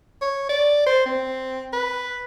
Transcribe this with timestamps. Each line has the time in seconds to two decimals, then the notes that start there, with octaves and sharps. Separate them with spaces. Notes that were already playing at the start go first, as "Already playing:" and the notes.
0.22 C#5
0.49 D5
0.87 C5
1.06 C4
1.73 B4